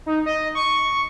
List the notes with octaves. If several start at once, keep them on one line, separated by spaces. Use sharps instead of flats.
D#4
D#5
C#6